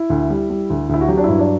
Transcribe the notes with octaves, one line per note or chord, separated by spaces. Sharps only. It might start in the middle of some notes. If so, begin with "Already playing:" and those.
Already playing: E4
D2
G3
G3
D2
D2 E4
F#4
F#3 G4
D4
G2 E4
D4